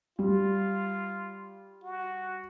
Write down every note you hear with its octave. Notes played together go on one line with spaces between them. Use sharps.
G3 F4
F#4